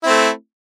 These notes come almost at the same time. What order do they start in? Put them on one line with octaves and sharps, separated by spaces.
E4 C4 A3